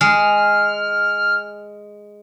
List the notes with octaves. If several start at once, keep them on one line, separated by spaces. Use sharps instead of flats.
G#3 F6